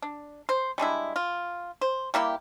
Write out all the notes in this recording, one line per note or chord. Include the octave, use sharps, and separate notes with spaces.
D4
C5
G3 G#3 D4 E4
F4
C5
G3 A#3 E4 G4